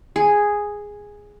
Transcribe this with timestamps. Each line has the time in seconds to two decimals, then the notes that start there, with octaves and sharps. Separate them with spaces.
0.16 G#4